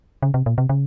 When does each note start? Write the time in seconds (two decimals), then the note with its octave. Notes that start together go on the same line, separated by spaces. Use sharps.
0.22 C#3
0.34 C3
0.46 A#2
0.58 C3
0.69 C#3